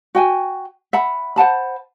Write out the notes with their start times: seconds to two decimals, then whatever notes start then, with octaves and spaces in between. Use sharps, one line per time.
0.15 F#4 G5 G#5
0.93 E5 F#5 B5
1.36 C5 F#5 A5 B5